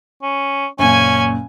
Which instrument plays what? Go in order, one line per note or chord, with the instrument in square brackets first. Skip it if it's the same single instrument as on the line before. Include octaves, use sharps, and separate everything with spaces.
[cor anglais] C#4
[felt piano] F#1 A#2 [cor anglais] C#4 [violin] G#5 G#6